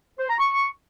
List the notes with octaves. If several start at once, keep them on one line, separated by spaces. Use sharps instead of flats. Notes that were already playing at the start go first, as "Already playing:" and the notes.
C5
A#5
C#6